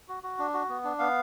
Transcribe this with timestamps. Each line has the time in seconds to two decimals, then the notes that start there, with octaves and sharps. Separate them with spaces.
0.09 F#4
0.23 F#4
0.39 D4
0.54 F#4
0.69 B3
0.84 D4
0.99 B3 F5